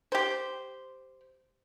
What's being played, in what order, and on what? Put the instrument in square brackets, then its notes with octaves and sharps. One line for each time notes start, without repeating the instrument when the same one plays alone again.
[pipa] G4 C5